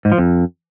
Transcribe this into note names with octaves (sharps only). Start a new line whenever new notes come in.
G#2
F3
F2